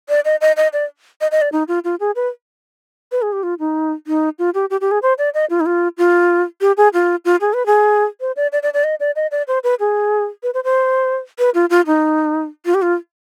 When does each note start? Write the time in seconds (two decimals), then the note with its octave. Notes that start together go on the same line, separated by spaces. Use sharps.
0.09 D5
0.25 D#5
0.41 D#5
0.57 D#5
0.73 D5
1.21 D#5
1.31 D#5
1.41 D5
1.52 D#4
1.68 F4
1.84 F4
2.00 G#4
2.16 B4
3.12 B4
3.22 G#4
3.33 G4
3.43 F4
3.59 D#4
4.07 D#4
4.39 F4
4.54 G4
4.70 G4
4.81 G4
4.91 G#4
5.02 C5
5.18 D5
5.34 D#5
5.50 F4
5.60 D#4
5.66 F4
5.98 F4
6.61 G4
6.77 G#4
6.94 F4
7.25 F4
7.41 G#4
7.53 B4
7.66 G#4
8.21 C5
8.36 D5
8.52 D5
8.63 D5
8.74 D5
8.84 D#5
9.00 D5
9.16 D#5
9.32 D5
9.48 C5
9.64 B4
9.80 G#4
10.43 B4
10.54 C5
10.64 C5
11.39 B4
11.54 F4
11.70 F4
11.87 D#4
12.66 F4
12.74 G4
12.82 F4